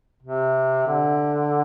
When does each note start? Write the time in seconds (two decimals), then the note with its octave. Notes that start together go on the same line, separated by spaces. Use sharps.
0.23 C3
0.87 D3